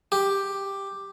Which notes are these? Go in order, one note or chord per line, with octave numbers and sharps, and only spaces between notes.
G4